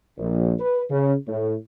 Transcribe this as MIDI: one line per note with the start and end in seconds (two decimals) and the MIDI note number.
0.18 0.54 34
0.58 0.83 71
0.89 1.14 49
1.27 1.55 45